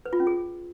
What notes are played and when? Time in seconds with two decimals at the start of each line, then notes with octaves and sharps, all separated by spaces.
0.06 B4
0.13 F4
0.20 C#4
0.27 G#4